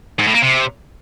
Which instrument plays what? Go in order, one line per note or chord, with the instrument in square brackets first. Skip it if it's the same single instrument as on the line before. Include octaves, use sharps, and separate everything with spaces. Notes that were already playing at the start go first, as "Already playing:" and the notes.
[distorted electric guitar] G#2
A2
A#3
C3